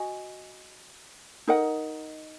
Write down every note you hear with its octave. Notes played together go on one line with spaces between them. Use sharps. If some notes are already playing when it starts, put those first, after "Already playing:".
Already playing: F#4 D#5 G#5
D#4 A#4 D#5 F#5